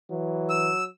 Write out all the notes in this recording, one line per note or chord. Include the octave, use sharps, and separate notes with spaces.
E3 F#3
E6